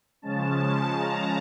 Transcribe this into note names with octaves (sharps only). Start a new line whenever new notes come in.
C#3 F3 G#3 C#4 A5
A#5